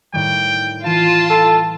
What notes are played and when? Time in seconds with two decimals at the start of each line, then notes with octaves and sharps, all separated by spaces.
0.13 A2 D#3 G3 G5
0.85 E3 F4 A5 E7
1.30 A4